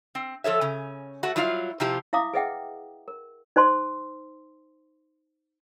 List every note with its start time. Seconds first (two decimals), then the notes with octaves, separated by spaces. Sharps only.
0.15 C4
0.44 F3 A4 C#5 E5
0.61 C#3 C#4
1.23 A3 F#4 F#5
1.36 F#3 G3 E4 F4 F5
1.80 C3 F3 E4 F4 G4
2.13 E4 E5 F5 A#5 D6 D#6
2.33 G#4 B4 D#5 E5 F#5 G5
3.08 A#4
3.56 D#4 C5 A5 C6